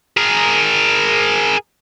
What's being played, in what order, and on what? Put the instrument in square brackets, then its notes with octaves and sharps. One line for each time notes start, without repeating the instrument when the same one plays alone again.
[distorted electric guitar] G#4 A#4